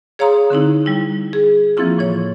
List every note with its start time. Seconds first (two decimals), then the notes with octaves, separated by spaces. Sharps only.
0.19 G#4 C#5 F5 A#5 C6 D#6
0.50 D3 C4 D#4 E4
0.86 G3 E4
1.33 G#4
1.77 E3 F3 A#3 C4 E4 F4
1.98 A2 E3 C#5